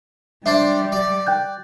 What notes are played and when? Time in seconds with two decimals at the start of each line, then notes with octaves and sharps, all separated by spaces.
0.46 G3 D4 C5 D5 E5
0.92 D5
1.27 G5 F#6 G6